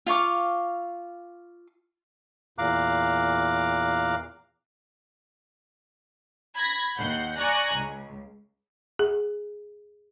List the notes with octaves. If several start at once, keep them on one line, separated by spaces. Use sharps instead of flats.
F4 F5 C#6 D6
E2 A#2 F5 A#5 D6 F#6
B5 G#6 A#6 B6
D#2 F#5 G6 C7
D5 G#5 A#5 C#6 F#6 A#6
C#2
G#4